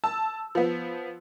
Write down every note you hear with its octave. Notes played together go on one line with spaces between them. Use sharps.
A5 E6
F3 B3